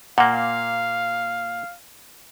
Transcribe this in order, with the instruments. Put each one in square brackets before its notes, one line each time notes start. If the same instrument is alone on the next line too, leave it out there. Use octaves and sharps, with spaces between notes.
[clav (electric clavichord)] A#2 A#3 [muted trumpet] F5 [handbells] F#5